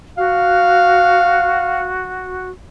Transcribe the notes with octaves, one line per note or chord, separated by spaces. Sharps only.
F#4 F5